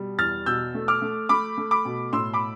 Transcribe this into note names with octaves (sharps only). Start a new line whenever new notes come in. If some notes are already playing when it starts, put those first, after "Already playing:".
Already playing: B2 G3
E2 F6 A6
B2 E6 G6
A3
D6 F6
A3
A3 B5 D6
A3
B5 D6
B2
A2 C6 E6
B5 D6